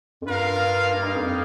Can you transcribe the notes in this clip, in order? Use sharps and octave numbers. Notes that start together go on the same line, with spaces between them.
F2
G2 F4 A#4 F5
G2 G3 A#3 D#4
F2